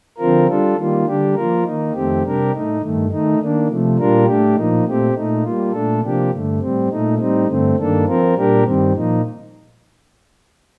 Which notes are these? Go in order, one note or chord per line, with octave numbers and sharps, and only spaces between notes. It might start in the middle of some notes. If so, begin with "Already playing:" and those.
D3 F3 C4 F4 A#4
G3 D4 F4 A4
D#3 G3 A#3 F4
D3 G3 D4 G4
F3 A#3 F4 A#4
D#3 A#3 D#4
F2 D#3 A3 C4 G4
C3 G3 D4 G4 A#4
A2 A3 D#4
G2 D#3 A3
D#3 A3 D#4
D#3 A#3 D4
C3 F3 A3
A#2 G3 D4 F4 A#4
A2 A3 D4 G4
A#2 F3 A#3 D#4
A#2 A3 C4 G4
A#2 A3 D#4
G3 A#3 F4
A#2 A3 D4 A4
C3 F3 A#3 D4 G4
G2 D3 A3
A2 G3 C4
A#2 A3 D#4
A2 G3 C4 D#4
G2 D3 A3 C4
G2 D#3 A#3 D4 A4
F3 C4 F4 A#4
A#2 G3 D4 G4 A#4
G2 D#3 G3 C4
A#2 F3 A#3 D#4